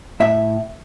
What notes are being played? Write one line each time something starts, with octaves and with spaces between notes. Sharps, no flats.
A2 E5